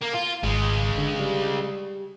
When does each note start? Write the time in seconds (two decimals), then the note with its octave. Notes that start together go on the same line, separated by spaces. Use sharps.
0.01 A#3
0.14 F4
0.43 G#1 C#2 G#3
0.98 D3
1.19 G3